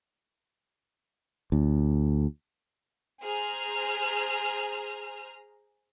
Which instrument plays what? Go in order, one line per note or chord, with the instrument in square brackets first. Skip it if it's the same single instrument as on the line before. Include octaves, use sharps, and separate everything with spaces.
[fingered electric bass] D2
[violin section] G#4 C5 A#5 F6